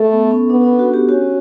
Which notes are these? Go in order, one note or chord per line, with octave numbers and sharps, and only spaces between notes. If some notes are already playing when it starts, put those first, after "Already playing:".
Already playing: A3 A4
B3
C#4
B3 D4
D4
F#4
G4
C#4 F#4